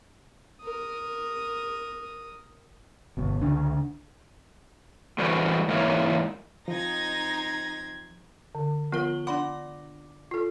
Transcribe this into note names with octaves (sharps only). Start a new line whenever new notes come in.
A#4 D#6
G1 B2
C#2 D3 D4
A2 E3 G3 F#4 A#4 C5
G#2 E3 A#3 A#4 C#5
F3 C4 D#4 G#6 A#6
D3
F3 B3 F4 A#4 G7
D4 D5 F#5 B5 C6 D6
F4 A4